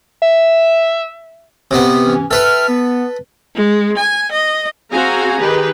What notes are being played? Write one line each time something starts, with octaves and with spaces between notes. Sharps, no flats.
E5
C3 B3
E3 C#4
A4 B4 E5 G5 F6
B3
G#3
G#5
D#5
C4 F#4 G#4 F5 G#5 A#5
D#3 G4 G#4 B4